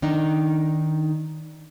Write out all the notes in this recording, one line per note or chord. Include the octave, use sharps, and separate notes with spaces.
D#3 D4 D#4